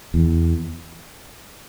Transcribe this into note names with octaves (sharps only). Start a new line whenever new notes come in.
E2